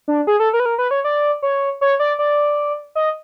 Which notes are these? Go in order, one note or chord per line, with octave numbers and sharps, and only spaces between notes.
D4
G#4
A4
A#4
B4
A#4
B4
C#5
D5
C#5
C#5
D5
D5
D#5